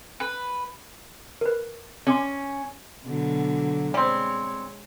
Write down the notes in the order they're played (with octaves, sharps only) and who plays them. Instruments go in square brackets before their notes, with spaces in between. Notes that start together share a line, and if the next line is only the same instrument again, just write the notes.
[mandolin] B4
[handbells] A#4 B4
[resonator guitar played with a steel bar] C#4 [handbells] C6 D6 G#6
[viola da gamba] B2 D3 F#3
[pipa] G3 C4 [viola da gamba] G#3 C#5